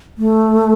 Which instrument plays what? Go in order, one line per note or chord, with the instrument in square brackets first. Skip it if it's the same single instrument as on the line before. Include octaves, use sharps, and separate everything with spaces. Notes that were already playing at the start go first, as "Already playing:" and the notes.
[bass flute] A3